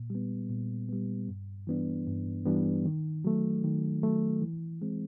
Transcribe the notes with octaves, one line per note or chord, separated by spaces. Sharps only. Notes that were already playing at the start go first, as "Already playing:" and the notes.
Already playing: A#2
G3 B3
A#2
G3 B3
G2
E3 G3 B3 D4
G2
E3 G3 B3 D4
D#3
F#3 A3
D#3
F#3 A3
E3
G#3 C4